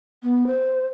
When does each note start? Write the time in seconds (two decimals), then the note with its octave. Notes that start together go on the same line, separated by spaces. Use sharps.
0.23 B3
0.47 C5